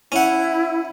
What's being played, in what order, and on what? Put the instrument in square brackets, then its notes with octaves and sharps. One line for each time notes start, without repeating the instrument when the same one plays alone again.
[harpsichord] C#4 F#5 [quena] E4